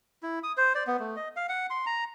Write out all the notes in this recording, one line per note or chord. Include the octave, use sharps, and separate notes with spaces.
E4
D#6
C5
D5
B3
A3
D#5
F5
F#5
C6
A#5